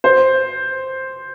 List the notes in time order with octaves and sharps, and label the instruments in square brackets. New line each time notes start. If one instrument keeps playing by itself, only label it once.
[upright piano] C5